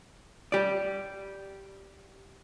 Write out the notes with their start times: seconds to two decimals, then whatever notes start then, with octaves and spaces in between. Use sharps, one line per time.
0.52 G4 D5